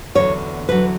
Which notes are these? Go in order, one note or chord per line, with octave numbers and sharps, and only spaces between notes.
E2 D3 F#3 C#5
E2 D3 F#3 B4